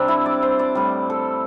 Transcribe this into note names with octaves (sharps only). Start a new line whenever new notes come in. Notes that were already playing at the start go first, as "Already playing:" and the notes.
Already playing: C3 G3 C4 D4
E4
D5
C5
D5
A2 G3
A4